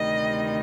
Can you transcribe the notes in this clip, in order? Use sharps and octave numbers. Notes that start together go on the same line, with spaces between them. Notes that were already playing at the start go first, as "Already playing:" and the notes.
Already playing: D2 C3 D#3 G3 D#5